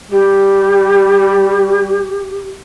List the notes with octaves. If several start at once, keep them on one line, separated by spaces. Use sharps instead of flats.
G3 G4